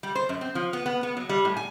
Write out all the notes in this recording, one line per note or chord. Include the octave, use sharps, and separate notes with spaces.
G3
C5
F#2
C4
F3
B3
B3
B3
F#3
G3
A2
G#5